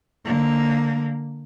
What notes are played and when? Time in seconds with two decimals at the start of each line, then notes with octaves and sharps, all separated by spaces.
0.25 D3 A#3